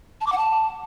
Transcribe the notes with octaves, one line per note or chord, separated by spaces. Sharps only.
A5
D6
F#5
A5